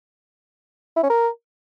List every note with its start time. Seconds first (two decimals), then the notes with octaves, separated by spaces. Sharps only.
0.97 E4
1.03 C#4
1.10 A#4